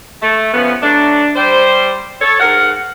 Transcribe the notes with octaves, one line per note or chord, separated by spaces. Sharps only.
A3
C#3 F3 B3
F#3 A3 D4
G3 C5
A4 C#5
G#2 A#4 F5 F#5